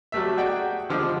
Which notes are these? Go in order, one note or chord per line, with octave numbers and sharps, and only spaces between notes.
F#3 G3 A3 E5
F#4 G#4 D5 G5
D3 F3 G3 G#3